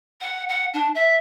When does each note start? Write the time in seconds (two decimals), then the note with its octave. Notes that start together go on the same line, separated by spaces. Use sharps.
0.21 F#5
0.49 F#5
0.74 D4
0.95 E5